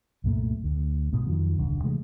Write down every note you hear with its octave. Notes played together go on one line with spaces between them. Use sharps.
C2 F#2 A#2 A3
D2
G#2 B2
F2 D#3 F3 F#3
D#1 C2 D3
C3 E3 G#3 A3